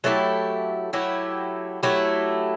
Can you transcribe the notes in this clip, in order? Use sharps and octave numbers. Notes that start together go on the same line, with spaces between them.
F#3 A3 E4 G4
F#3 A3 E4 G4
F#3 A3 E4 G4